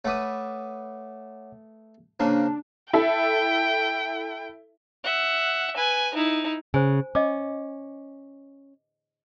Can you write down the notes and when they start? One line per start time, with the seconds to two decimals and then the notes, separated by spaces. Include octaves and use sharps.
0.05 A3 B4 C#5 F#5 D6 D#6
2.20 C#3 A#3 D4 C5 C#5
2.93 E4 A4 E5 G5
5.04 E5 F#5
5.76 B4 G#5
6.14 D#4 E4
6.74 C#3 C5 G#5
7.15 C#4 D#5 D6